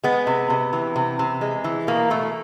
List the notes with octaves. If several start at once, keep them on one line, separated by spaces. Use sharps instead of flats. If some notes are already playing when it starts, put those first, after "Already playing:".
G#3 B3
C3
C3
E3
C3
C3
G#3
E3
B2 A#3
B2 A3